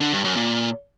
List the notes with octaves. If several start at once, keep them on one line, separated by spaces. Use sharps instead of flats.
D3
G2
F#2
A#2